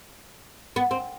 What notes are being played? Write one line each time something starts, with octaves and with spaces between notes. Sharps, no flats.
B3
C4